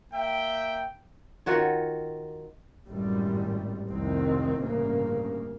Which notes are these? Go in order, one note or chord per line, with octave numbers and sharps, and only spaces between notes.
A#3 E5 G5
D#3 F4 F#4 C#5
G#1 F#2 A2 G3
F1 C2 D#3 C4
A1 D2 G2 C#3 A#3